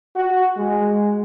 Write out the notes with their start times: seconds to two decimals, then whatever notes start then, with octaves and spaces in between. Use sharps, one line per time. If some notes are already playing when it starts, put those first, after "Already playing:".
0.16 F#4
0.58 G#3